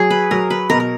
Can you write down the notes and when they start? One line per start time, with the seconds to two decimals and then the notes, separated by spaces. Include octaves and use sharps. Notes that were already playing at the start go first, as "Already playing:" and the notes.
Already playing: F#3 G#4
0.10 B4
0.31 F#3 A#4
0.50 B4
0.70 B2 A#4
0.80 A#4